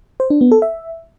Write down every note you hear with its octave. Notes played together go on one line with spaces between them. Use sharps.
C5
D4
B3
A4
E5